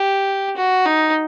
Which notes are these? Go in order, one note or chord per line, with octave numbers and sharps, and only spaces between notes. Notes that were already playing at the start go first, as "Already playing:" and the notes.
Already playing: G4
F#4
D#4